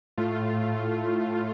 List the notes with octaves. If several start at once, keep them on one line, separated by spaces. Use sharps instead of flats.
A2 A3 F4